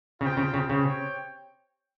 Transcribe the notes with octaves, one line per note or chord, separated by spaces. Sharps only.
C#3 F4 C5 G5
C#3
C#3
C#3 C4 G4 C#5 G5